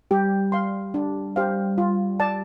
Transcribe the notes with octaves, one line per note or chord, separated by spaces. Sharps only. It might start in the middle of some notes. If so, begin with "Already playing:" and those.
G3 G4
F5 C6
D4
G4 C5 F5
F4
D5 A5